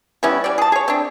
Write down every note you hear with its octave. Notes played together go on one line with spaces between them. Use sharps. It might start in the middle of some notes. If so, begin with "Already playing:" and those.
G3 B3 C#4 E4
G3 D5
G#4 A5
G#4 C#5
C4 D4